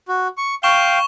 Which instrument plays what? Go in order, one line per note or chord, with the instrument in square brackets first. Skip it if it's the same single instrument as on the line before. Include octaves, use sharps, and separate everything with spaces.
[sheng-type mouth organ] F#4
C#6
[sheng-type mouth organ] F5 G5 [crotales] C#6 E7 G7